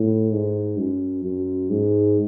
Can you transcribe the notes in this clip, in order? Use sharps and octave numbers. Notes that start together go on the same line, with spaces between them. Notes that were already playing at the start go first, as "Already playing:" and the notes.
Already playing: A2
G#2
F#2
F#2
G#2